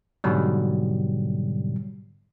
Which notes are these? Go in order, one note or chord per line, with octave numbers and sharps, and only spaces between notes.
G#2 B2 D3 F#3 G3